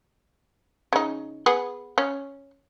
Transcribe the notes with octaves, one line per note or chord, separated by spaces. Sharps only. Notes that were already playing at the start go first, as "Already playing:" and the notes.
C#3 D#4
B3 G#4
C#4